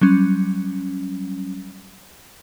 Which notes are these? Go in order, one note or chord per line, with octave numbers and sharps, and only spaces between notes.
F#3 G3 C#4